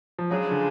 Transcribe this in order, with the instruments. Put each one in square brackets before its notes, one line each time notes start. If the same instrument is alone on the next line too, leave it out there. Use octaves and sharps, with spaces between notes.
[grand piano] F3
[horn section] C#3 F3 G#3 D4 G#4 [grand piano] F#3
[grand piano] D3